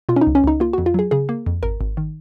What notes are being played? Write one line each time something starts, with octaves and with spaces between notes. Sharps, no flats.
B2 F4
C#4
D#4
C#2
C#4
C#2 D#4
A#3 F4
F2 F#4
F4
F#3 G#4
C#3 G#4
A#3
F2
G#1 A#4
G#1
D#3